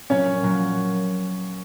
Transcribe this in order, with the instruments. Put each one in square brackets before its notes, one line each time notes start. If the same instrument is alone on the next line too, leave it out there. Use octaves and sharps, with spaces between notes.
[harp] A#2 F#3 A#3 [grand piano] C#4 C#5
[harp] A#2 F#3 A#3